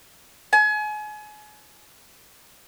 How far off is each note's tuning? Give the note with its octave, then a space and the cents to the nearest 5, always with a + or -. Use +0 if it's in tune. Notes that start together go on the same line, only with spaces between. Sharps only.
G#5 +35